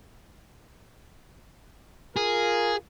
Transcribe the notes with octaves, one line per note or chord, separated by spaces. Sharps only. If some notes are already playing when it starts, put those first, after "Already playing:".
F4 G#4 A#4